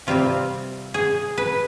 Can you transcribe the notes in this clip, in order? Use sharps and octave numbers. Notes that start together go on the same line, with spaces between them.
C3 G3 C4 F4
G#4
B4